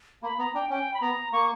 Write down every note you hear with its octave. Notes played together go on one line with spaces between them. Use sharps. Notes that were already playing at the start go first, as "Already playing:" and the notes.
A#3 B5
B3 A#5
D4 G5
C#4 G5
B5
B3 A#5
A#3 C#6